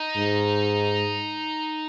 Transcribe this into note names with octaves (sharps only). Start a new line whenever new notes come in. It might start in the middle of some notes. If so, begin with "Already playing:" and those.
Already playing: D#4
G#2